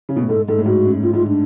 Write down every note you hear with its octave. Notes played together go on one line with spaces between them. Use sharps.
C#3
B2
A2
G#2 A4
G#2 A4
A2
G#2 F#4
F#2
A2 F4
G#2 F4
D4